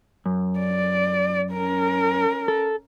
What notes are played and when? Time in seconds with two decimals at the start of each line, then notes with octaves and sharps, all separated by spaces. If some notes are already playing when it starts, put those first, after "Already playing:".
0.26 F#2
0.60 D5
1.53 C#4 A#4
2.48 A4